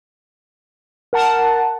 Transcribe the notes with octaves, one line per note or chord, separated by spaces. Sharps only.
A#4 F#5 A5